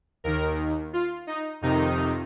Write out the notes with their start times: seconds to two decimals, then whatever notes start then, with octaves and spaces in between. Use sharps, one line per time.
0.24 D#2 D#3 A#4
0.93 F4
1.27 D#4
1.61 F2 C3 D#3 D#4